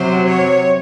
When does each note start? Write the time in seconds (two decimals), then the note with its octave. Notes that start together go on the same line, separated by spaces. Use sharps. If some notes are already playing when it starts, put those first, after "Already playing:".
Already playing: C3 F#3 C5
0.26 C#5